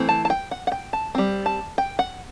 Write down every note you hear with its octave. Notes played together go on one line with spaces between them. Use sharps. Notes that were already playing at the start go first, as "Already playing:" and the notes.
Already playing: E3 A3 C4
A5
A5
G5
F#5
F#5
G5
A5
G3 C4
A5
G5
F#5